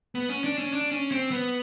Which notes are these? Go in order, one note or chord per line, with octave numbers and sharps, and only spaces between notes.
B3
C#4
D4
C#4
D4
C#4
C4
B3